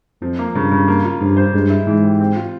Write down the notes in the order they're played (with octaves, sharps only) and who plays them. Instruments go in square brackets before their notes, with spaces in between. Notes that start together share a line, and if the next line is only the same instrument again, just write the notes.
[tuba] F2 [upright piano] F3
[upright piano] A#3
[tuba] G2 [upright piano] C#3
[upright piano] C#3
A#3
F4
[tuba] G2 [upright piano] F3
[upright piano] C5
[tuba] G2 [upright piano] G#3
[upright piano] E4
[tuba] G#2 [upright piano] E3
[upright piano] G4
C4
F4